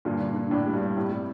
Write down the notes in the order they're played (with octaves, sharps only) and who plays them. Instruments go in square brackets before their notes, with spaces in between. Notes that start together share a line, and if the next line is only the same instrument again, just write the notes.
[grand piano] G2 A#2 [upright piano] D3
[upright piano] D3
D3
[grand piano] A2 [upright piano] D4
[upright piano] G3
[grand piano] G2
[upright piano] G3
[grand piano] A2 [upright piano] C3
[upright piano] G3